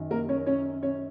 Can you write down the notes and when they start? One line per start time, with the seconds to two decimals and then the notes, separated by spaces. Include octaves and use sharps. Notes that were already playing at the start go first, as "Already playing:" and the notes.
Already playing: F#2 D#3
0.11 A#3 A#4
0.29 C#4 C#5
0.46 C#4 C#5
0.83 C#4 C#5